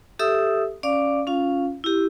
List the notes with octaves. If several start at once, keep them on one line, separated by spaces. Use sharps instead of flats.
G4 A4 E5 D#6 E6
C#4 D5 F5 D6
C#4 F4 F5
E4 G4